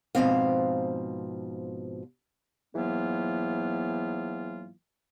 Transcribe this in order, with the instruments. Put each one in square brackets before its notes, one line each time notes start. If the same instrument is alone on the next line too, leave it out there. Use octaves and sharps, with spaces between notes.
[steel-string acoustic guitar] G#2 B2 F3 C4 F5
[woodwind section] G#2 E3 F#3 A#3 B3 F4